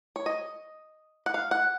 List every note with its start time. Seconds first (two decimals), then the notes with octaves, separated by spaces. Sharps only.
0.16 C#5
0.26 D#5
1.26 F#5
1.34 F5
1.51 F#5